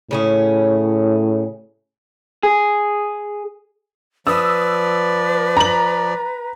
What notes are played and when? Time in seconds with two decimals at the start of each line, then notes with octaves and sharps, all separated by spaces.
0.11 A2 C#3 C#4 G#4
2.43 G#4
4.27 F3 B4 D5 D#6 E6
5.57 A#5 F#7